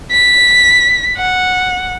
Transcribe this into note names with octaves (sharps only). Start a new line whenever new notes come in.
B6
F#5